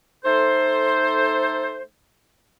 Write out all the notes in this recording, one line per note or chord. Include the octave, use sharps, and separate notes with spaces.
A3 D#4 A4 C5